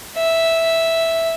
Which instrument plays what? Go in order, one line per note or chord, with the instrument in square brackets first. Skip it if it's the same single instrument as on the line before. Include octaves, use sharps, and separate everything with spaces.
[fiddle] E5